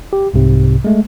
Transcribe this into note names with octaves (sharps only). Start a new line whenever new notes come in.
G4
C2 G#2 C3
G#3 A3